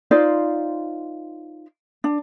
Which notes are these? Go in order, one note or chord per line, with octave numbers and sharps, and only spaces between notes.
D#4 F4 C5 D5
D4